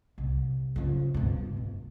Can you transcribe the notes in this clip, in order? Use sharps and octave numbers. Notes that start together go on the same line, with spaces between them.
C2
C#3 F3
G2 B2
D1